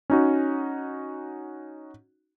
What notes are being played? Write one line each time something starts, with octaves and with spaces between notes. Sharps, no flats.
C#4 D#4 F#4